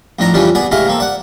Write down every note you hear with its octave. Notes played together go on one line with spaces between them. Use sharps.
F2 A2 D4 A#5
F2 C#3 E3 G3 C#4 D4
B3 G#4 D5
G#2 C3 G#3 A3 E4 F5
A#3 C4 A4
D5 F#5